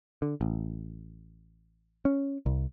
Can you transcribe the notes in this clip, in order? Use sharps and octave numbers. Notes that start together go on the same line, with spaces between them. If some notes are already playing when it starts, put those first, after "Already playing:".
D3
A1
C#4
C2